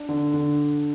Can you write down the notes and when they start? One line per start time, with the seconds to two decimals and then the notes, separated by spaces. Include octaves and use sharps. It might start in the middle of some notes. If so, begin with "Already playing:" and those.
Already playing: D4
0.09 D3
0.34 D3